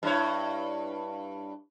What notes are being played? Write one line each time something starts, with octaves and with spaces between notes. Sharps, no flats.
G2 E4 C#5